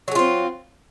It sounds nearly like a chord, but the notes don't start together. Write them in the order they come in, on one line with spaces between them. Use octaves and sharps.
F#3 G#4 F4 C4